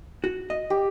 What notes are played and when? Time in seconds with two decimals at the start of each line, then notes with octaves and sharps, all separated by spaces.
0.24 F#4
0.50 D#5
0.70 G4